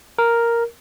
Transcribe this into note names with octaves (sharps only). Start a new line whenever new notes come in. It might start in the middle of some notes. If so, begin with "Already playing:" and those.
A#4